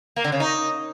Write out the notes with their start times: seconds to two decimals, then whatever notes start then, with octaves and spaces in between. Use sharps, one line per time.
0.16 A#3
0.24 D3
0.32 C#3
0.40 D#4